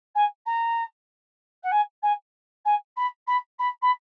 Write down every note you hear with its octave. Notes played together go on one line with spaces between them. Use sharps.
G#5
A#5
F#5
G#5
G#5
G#5
B5
B5
B5
B5